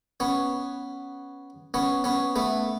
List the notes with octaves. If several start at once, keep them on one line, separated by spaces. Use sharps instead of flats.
B3 C#4
B3 C#4
B3 C#4
A3 B3